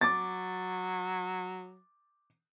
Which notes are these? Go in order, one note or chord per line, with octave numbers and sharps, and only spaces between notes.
F#3 D6 A6